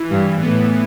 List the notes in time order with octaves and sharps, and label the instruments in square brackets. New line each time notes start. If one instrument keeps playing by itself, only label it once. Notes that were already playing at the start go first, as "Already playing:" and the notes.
Already playing: [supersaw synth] E3
[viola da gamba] G2
[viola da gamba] A2 [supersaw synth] B3